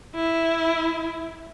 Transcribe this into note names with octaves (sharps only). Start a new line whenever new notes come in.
E4